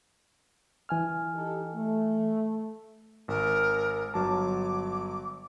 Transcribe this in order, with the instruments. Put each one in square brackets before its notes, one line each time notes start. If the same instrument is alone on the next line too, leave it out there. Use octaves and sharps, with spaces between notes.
[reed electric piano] E3 G#5 F6
[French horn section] D#4 G4 A4
A3
[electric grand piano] G#1 [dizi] A#4
[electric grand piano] G1 F#3 A5 [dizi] D6